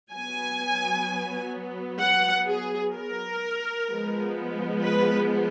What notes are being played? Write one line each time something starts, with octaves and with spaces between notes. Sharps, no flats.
F#3 B3 G#5
F#5
G#4
A#4
F3 G#3 B3
B4